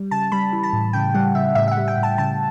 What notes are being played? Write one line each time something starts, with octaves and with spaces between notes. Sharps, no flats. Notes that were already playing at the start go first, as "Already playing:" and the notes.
Already playing: G3
C#3 A5
G3 B5
E3
A5
A2
C#3 G5
G3 F#5
C#3 E5
A2 E5
E5
F#5
G3
G5
A2
A5
C#3 A5